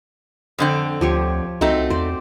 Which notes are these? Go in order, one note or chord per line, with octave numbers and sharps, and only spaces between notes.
F2 D3 C4
D2 F3 G4 C#5
C2 A3 C4 D#4 F#4
E2 C5 D5